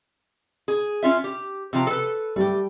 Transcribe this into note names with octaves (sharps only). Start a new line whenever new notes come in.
G#4
C#4 F4 E5
G4
C3 F3 A#5
A4 B4
G3 A3 G4